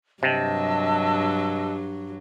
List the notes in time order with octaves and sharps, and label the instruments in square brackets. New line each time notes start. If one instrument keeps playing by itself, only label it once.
[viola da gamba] G2 F#3 [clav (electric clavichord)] C3 [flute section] D#5 A5 E6